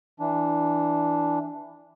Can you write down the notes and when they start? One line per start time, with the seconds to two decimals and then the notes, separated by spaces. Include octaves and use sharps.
0.20 E3 D4